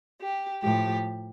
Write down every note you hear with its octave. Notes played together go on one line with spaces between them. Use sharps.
G4
A2 F3 G4